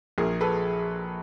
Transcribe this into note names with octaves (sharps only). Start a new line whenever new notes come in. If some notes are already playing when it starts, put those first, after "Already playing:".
A#1 G#4 A#4
A4 B4